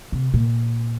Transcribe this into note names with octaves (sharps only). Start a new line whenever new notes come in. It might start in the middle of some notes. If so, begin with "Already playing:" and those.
C3
A#2